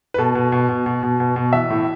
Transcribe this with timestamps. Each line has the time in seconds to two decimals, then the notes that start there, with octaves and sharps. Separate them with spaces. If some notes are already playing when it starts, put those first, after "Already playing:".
0.14 B4
0.18 B2 A4
0.35 B2
0.52 B2
0.69 B2
0.86 B2
1.03 B2
1.20 B2
1.36 B2
1.53 E3 E5
1.70 A2